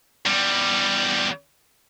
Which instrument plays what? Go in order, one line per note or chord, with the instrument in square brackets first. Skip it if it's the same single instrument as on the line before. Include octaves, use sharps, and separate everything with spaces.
[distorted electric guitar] E2 G3